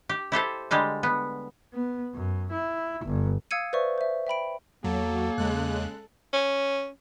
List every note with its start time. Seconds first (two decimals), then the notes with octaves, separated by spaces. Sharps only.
0.09 G4
0.32 E4 G4 A4 C5
0.71 D3 G3 G#3 G4
1.03 B3
1.74 B3
2.14 F#2
2.52 E4
3.05 G1
3.51 F5 D#6 E6 G#6 C#7 D#7
3.73 B4 C5 D5 E5 C#6
3.98 C5 E5
4.27 E5 G5 B5 D7
4.84 E2 F#3 A#3 A4
5.38 E2 C#3 G#3 F#6
6.33 C#4